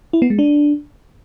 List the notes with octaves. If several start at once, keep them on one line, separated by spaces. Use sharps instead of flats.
E4
B3
G#3
D4